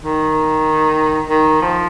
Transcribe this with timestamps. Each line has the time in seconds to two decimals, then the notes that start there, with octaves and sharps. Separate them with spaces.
0.03 D#3
1.30 D#3
1.62 F3